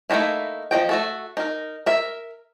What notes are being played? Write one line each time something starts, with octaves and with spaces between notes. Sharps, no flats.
A3 A#3 C4 D#4 E4
F3 D#4 D#5 G5
A3 F#4 A4
D#4 A#4
A#4 E5